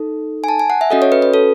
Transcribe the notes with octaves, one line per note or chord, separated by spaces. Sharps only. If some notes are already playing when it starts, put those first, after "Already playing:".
Already playing: D#4 A4
G#5
A5
G#5
F#5
E5
C#4 F#4 A4 D#5
C#5
B4
B4
A4